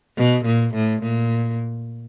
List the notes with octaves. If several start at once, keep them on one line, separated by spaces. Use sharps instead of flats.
B2
A#2
A2
A#2